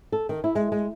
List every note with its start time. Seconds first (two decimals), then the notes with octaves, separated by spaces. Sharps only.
0.12 A4
0.29 D#3
0.44 E4
0.55 G#3
0.72 G#3